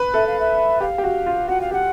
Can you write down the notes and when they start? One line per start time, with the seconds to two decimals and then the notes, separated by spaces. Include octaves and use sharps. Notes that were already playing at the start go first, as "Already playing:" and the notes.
Already playing: B4
0.14 A4 E5
0.27 F5
0.40 E5
0.81 G4 F5
0.98 G4
1.04 F#4
1.26 F4
1.48 F#4 F#5
1.61 F5
1.71 G4 F#5